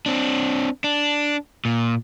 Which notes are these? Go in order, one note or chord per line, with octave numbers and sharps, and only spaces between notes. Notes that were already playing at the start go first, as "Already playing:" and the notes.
C4 D4
D4
A#2